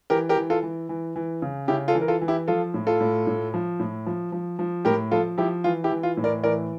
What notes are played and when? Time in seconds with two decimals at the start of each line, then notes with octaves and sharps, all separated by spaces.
0.10 E3 G4 A#4
0.29 G4 A#4
0.36 E3
0.50 F4 A4
0.63 E3
0.89 E3
1.16 E3
1.42 C#3
1.68 C#3 E4 G4
1.88 F4 A4
1.95 E3
2.01 A#4
2.08 F4 A4
2.22 E3
2.28 E4 G4
2.48 F3 F4 A4
2.74 A2
2.87 F4 A4
3.00 A2
3.27 A2
3.54 F3
3.80 A2
4.06 F3
4.32 F3
4.59 F3
4.85 A2 G4 A#4
5.11 F3 F4 A4
5.38 F3 E4 G4
5.64 E3 F4
5.84 E4 G4
5.91 E3
6.03 F4
6.17 A2
6.24 A#4 D5
6.43 E3 A#4 D5